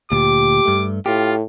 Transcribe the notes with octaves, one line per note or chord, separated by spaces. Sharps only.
D2 A#2 G4 D6
G2 A3
A2 F4 G4